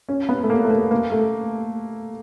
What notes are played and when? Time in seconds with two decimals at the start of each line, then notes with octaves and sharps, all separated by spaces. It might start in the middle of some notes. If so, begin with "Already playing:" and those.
0.09 C#4
0.29 B3
0.43 A3
0.50 A#3
0.65 A3
0.70 A#3
0.91 A#3
1.12 A3